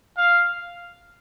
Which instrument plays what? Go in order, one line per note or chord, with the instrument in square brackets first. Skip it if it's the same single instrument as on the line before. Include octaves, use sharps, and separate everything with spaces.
[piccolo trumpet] F5